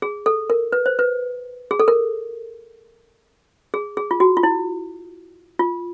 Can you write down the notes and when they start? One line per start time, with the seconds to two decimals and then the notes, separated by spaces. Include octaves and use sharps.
0.02 G#4
0.26 A4
0.50 A#4
0.72 B4
0.86 C5
0.99 B4
1.71 G#4
1.80 A4
1.88 A#4
3.74 G#4
3.97 G#4
4.11 F4
4.20 F#4
4.37 F4
4.43 E4
5.59 F4